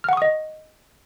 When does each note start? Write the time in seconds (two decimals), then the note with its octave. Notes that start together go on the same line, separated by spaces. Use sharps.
0.04 F6
0.09 F#5
0.13 C#6
0.17 D#6
0.22 D#5